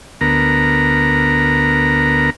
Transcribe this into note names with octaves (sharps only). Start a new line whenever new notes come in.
D2 B3 A#4 A#5